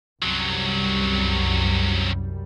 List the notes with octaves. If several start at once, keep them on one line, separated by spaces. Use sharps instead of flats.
C2 F#2 C3 F#3 G3